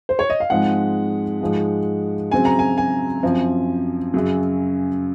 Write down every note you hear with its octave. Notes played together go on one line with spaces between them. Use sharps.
C5
C#5
D#5
F5
G#2 F3 G#3 C4 F#5
G#2 F3 G#3
C#3 F#3 C4 G#5
A#5
G#5
G#5
F#2 F3 C4
F#2 C#3 F#3